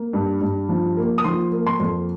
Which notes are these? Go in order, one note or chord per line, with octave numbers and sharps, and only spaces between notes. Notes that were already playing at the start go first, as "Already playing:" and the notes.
Already playing: A#3
G2
G2
F3
A#3
D#6
F3 C6
A#3
C6
F2